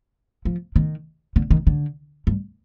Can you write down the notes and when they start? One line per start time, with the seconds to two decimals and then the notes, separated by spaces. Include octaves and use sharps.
0.45 F3
0.76 D#3
1.36 D3
1.51 D#3
1.67 D3
2.27 G2